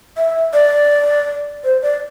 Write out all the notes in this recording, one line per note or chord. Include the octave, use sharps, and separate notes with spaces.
E5
D5
C5
D5